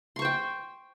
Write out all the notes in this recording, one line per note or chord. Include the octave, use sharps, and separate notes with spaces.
C5 G5 C6 C#6